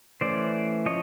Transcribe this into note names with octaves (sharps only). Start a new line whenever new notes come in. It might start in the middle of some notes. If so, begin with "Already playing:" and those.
E3 A3 C#4 C5 D5
F3 C#5 D#5